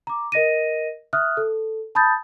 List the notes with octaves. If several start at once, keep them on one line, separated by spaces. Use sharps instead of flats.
A#5 D6
A#4 D#5 A#6 D#7
E5 D#6 F6 F#6
A4
A5 B5 D#6 G6 A6